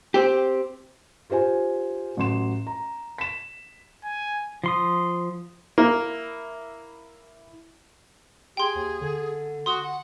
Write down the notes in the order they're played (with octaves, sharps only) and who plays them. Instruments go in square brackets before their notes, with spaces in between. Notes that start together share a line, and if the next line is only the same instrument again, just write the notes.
[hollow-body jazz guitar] C4 G4
[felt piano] F4 G4 C5 G#5
A1 F#3 C6 E7
A#5
B6 E7
[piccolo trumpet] G#5
[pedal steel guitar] F3 C6 D#6
[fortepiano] A#3 [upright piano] E4
[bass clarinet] G4 [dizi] G#4 [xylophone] G5 C6
[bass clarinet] D#2
D3
[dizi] F#4 [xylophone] C6 D#6 G7
[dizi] F#5